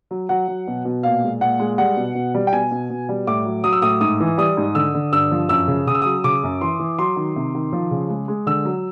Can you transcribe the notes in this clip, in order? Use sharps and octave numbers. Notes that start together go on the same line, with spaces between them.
F#3
F#3 F#5
F#3
B2
B2
A#2 F5
G#3
A#2 F#5
G#3
G3 F#5
B2
B2
G3
G5
B2 G#5
B2
B2
G3
A2 D6
F#3
F#3 D#6
E6
A2 D#6
G#2 D#6
E3
G3 D#6
G#2
D3 E6
D3
G2 E6
F3
F#2 E6
C#3
C#3 D#6
E6
F#3 D#6
C#3 D6
F#2
E3 C6
E3
F#3 C6
D#3
C3
D#3
F3
C#3
G#3
G#3
D3 E6
F#3